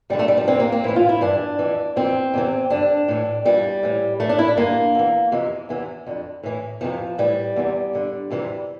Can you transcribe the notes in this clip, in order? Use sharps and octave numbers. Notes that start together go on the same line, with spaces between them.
E2 D3 G3
A3
G3
F3
E2 C3 E3 C4
A#3
C4
A2 E3 E4
F4
E4
G2 E3 D4
F2 E3
F2 E3 C4
E2 C3 E3
G2 D3 D4
A2 E3
F2 E3 G3
A2 E3
A2 E3 A3
D4
E4
D4
G2 D3 A#3
E2 E3
F2 C3 E3
E2 C3 E3
F2 D3
A2 E3
F2 C3 E3 F3
A2 E3 G3
E2 C3 E3
G2 D3
F2 C3 E3